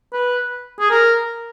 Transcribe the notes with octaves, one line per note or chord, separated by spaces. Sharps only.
B4
G#4
A#4